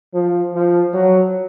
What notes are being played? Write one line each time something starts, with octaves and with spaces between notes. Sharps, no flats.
F3
F3
F#3